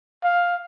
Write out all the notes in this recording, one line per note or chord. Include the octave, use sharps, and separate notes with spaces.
F5